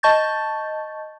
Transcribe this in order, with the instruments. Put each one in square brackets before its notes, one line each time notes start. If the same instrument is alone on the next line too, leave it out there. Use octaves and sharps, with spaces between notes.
[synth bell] D#5 A5 C#6 G6 A6